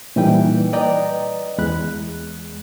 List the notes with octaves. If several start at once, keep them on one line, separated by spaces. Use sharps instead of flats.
A#2 E3 G3 D#4 B4 G5
B4 D5 D#5 G5 A#5
E2 G#3 B5 F#6